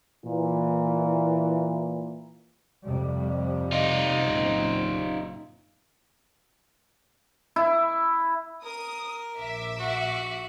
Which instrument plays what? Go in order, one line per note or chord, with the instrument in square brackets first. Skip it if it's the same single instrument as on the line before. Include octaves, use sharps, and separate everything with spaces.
[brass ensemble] A#2 E3
[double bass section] F2 C3 G3
[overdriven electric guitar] D#4 F4
[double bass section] F#1 A#2 C4
[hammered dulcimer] E4
[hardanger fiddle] A#4 [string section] D#6
[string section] A#1 E5 D6
[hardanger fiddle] F#4